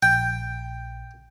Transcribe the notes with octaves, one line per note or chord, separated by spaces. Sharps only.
A#1 G5